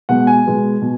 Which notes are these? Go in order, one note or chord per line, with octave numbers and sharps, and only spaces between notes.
B2 G#3 B3 F#5
G#5
B2 G#3 B3
B2